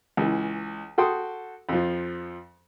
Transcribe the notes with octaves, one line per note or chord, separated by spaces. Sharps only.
C#2 E3
F#4 A4 G5 C6 D#6
F2 F3